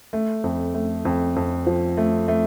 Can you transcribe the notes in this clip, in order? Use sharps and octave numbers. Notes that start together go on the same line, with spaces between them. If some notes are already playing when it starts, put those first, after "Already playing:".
A3
F2
A3
F2
F2
F3
A3
A3